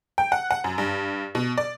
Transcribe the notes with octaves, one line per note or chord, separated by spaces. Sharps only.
G5
F#5
F#5
F#2
G2
B2
D5